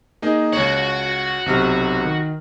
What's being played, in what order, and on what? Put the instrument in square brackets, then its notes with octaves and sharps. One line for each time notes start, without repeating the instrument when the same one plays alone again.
[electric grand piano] A#3 D#4 G#4
[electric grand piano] C#2 C#5 [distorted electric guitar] F#4 F#5
[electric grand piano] B1 C3 F6
D#3